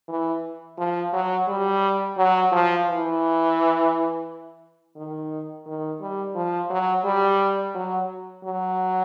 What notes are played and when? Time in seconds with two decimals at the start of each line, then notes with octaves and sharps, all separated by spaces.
0.09 E3
0.78 F3
1.13 F#3
1.48 G3
2.17 F#3
2.52 F3
2.87 E3
4.97 D#3
5.66 D#3
6.01 G3
6.35 F3
6.70 F#3
7.04 G3
7.75 F#3
8.44 F#3